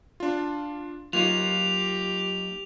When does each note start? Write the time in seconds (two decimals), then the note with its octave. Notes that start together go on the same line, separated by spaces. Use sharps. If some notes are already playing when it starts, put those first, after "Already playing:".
0.20 D4 F4
1.13 F#3 A#3 D#4 F4 G4 F7